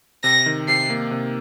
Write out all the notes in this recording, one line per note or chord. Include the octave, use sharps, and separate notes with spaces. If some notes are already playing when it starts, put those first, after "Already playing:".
C3 A#6
D#3
C3 C7
A#3
C3